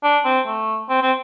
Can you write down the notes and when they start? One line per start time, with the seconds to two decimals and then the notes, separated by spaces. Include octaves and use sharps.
0.03 D4
0.25 C4
0.47 A3
0.89 C4
1.02 C4